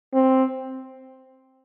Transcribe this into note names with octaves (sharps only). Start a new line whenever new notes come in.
C4